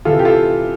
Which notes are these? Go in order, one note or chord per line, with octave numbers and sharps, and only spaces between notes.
C3 E3 F4 A4
G4
F4 A4